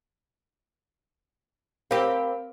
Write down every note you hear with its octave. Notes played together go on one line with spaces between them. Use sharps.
C4 G4 A#4 F5 B5